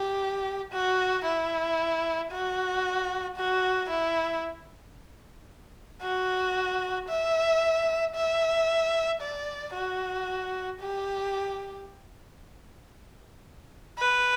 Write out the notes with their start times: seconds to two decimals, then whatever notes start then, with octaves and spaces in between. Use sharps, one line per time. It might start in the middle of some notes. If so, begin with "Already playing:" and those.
Already playing: G4
0.72 F#4
1.25 E4
2.32 F#4
3.37 F#4
3.90 E4
6.03 F#4
7.09 E5
8.15 E5
9.21 D5
9.74 F#4
10.80 G4
13.98 B4